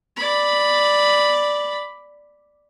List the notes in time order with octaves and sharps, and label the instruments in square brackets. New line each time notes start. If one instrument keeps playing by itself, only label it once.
[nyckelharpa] D5 B5